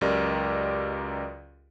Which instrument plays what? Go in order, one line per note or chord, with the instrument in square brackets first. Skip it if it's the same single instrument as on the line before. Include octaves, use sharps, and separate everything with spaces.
[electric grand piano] C#2 F#2 G4 A#4 D5 D#5